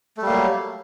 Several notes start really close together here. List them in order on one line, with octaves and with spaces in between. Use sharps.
A3 G3 A#3 F#3